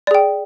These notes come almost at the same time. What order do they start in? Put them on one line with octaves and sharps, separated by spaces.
D5 G#4 G5